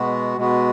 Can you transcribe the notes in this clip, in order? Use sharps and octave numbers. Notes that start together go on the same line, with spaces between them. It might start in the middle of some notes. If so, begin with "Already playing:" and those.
Already playing: B2 G#3 B3 F#4
B2 G#3 B3 F#4